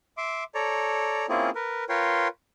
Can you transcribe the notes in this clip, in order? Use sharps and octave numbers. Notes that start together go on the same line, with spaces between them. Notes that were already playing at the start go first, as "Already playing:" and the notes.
E5 C6 D6
A4 C#5 D5 A#5
A#3 C4 C#4 E4 F4 G#4
A#4 B4
F4 A#4 B4 C#5 G5 C6